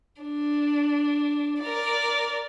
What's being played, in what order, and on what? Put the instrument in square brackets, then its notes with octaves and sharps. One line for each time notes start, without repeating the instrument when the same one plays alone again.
[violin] D4
A#4 D5